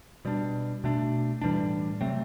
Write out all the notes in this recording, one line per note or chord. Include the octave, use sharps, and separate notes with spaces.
B2 G3 D4
B2 A3 D4
A2 E3 G3 D4
C3 F#3 A3 C4